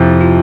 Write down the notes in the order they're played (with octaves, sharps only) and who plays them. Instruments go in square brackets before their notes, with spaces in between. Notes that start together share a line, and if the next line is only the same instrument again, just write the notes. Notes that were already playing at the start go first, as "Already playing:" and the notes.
Already playing: [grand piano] F2 C3 F3 [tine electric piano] E4
[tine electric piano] F4